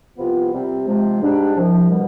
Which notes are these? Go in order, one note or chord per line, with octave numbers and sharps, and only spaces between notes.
C2 C3 F3 B3 F4
C3 G3 C4
C3 F3 G#3
G#2 G3 D4
C2 C3 F3
B2 G3